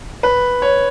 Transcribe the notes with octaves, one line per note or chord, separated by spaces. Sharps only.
B4
C#5